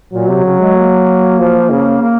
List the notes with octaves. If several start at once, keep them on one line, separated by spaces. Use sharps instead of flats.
A#2 F#3
C3
C#3
G#3
A#3
F3
C#3
A#3